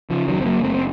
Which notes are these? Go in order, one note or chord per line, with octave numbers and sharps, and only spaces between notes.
C#3 F3
D#3 F#3
F#1
C4
F#3 A#3
F#1
A3 C4
C4